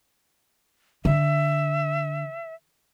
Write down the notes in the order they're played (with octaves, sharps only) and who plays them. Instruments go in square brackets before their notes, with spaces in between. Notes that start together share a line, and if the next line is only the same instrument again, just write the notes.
[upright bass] D3 [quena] E5